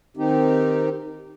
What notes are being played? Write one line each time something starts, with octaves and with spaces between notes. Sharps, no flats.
D#3 C4 D#4 G4